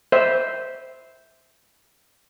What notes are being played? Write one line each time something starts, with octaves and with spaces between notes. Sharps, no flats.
C5 E5